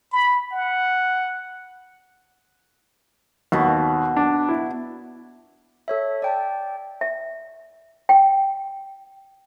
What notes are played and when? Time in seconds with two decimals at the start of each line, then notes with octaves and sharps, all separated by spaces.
0.12 B5
0.52 F#5
3.52 D#2 B2 F#4
4.17 D4
4.49 E4
5.88 A4 C#5 E5
6.22 D5 G5 A5
7.01 E5
8.09 G5